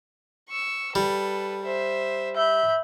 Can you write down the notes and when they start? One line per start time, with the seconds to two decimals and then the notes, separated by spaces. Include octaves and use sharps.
0.49 C#6 E6
0.95 G3 A4 B4
1.63 C5 E5
2.36 E5 B5 G6